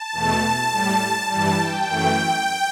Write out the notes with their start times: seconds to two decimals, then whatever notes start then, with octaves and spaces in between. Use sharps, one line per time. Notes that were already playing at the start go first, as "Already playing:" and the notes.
Already playing: A5
0.12 E2 B2 A3
0.71 A2 G3
1.28 G2 E3 G3 A5
1.57 G5
1.87 F#2 E3 A3